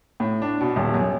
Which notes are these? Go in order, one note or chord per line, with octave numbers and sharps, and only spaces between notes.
A2
D4
B2
D#1
F#2